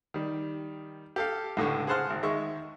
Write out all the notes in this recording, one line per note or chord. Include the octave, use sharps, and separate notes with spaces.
D#3 G3
G4 A4 F5
C#2 A2 D3 C#6
G#4 C5 F#5 A5 C6 F6
G#1
D#3 G#3 D#4 E5 C#6